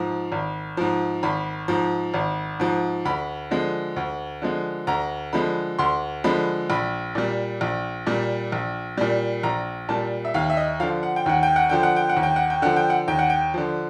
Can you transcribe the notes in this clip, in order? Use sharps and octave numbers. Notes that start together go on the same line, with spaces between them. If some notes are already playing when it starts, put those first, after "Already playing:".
Already playing: G#2 F3
G#1
G#2 F3
G#1 B5
G#2 F3
G#1
G#2 F3
D2 B5
D3 F3 G#3
D2
D3 F3 G#3
D2 A#5
D3 F3 G#3 B5
D2 C6
D3 F3 G#3 B5
A#1 B5
A#2 G3
A#1
A#2 G3
A#1
A#2 G3
A#1 A#5
A#2 G3 A5
E5
D#2 F5
E5
D#5
D3 F3 F5
F#5
G5
D#2 F#5
G5
F#5
D3 F3 G5
F#5
G5
F#5
D#2
G5
F#5
G5
D3 F3 F#5
G5
F#5
D#2 G5
F#5
G5
D3 F3